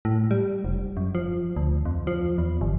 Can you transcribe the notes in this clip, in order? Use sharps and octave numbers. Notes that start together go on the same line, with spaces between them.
A2
G3
F1
F#2
F3
D2
F2
F3
E2
G1